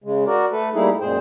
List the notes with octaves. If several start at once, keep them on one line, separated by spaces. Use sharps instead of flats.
C#3 G#3
F#4 A#4 D5
A3 A4 B4
G3 A3 A#3 D#4 E4 G#4
F#2 A#2 G#3 G#4 C5 G5